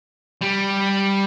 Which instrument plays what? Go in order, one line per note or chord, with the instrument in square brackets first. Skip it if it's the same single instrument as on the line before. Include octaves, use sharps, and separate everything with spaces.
[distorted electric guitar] G3